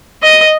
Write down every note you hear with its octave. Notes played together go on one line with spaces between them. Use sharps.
D#5